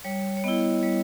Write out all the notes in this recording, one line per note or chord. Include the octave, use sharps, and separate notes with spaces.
G3 C#5
C#5
B3 E4 D#5
G3 C#5